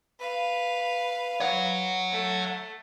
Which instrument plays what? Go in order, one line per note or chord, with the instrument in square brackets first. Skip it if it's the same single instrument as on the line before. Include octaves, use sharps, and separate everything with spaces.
[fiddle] B4 F5
[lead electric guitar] C#5 F#5
[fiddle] A3